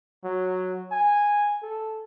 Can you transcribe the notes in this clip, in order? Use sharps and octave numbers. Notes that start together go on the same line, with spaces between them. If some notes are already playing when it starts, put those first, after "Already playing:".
F#3
G#5
A4